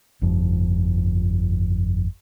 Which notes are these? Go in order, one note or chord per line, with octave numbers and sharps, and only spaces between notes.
G1 F2 F3